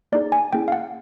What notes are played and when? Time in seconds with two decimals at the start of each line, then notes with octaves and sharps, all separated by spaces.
0.12 A#3 D#4 G#4 D5
0.32 G#5
0.53 A#3 C#4 E4 G#4 G5
0.68 F5
0.72 F#5